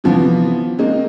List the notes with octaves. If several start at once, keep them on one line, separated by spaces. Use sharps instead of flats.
C3 E3 F3 B3
G#3 A#3 C4 D#4